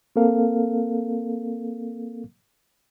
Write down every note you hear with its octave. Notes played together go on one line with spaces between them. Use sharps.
A#3 C4 A4 A#4 F5